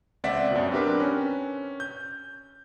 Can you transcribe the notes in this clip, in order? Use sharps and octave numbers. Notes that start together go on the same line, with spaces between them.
C#2 C4 D5 E5 F#5 B6
F#2 B2
C4 D4 G4 A#4 B4
C#4
G6